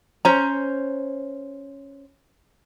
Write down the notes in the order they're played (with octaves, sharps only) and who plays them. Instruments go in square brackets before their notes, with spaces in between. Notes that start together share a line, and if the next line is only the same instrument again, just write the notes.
[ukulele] C#4 C5 A#5